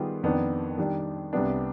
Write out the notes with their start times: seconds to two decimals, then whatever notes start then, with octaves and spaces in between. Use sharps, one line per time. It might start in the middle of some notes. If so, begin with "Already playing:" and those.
Already playing: D#3 G3 B3 F4 G#4
0.23 F2 D#3 B3 D4
0.78 D#3 G3 D4
1.33 C2 C3 G3 B3 D4